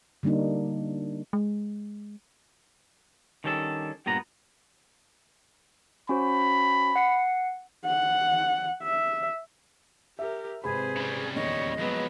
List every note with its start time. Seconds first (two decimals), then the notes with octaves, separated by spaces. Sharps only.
0.23 D3 G3 A#3 D4 D#4
1.33 G#3
3.44 D#3 G3 C#4 D4 A4
4.06 G2 A#2 B3 A#5
6.09 C#4 F#4 C5 B5
6.96 F#5 C7 C#7
7.86 F#5
8.83 E5
10.19 G4 A#4 E5
10.64 G#1 C3 G#4 B4 C5 B5
10.97 C#3 G3
11.35 D#1 E2 D#3 C#5 D#5
11.79 F2 F#3 G#3 B3